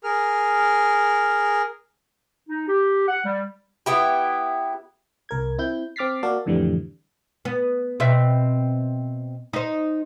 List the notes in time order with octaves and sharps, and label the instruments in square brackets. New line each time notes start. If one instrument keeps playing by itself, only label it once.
[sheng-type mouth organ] G#4 A#4 F6
[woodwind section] D#4
G4
F#5
G3
[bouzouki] B3 E4 G4
[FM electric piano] C2 A#4 G#6
C4 E4 G6
C4 D6 F6 A6 B6 C7
A#3 F#4 D5 F5 A5
F2 A2 D3 E3 G3
[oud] B3
B2 C4 E5
D#4 C5